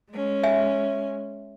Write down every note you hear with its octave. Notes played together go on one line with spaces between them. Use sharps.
G#3 C#4
E5 G#5